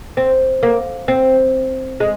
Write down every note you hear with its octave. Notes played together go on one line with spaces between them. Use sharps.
C4
A#3
C4
G#3